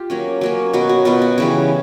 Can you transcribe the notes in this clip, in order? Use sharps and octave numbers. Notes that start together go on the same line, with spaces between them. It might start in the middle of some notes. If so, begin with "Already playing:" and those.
Already playing: F4 G4
F#3 A#3 C#4
F#3 A#3 C#4
B2 F#3 B3 F#4
F#4
B2 F#3 B3 F4
F#4
C#3 E3 G3